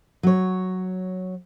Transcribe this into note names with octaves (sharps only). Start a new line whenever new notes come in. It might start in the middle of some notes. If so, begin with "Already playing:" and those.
F#3 C#5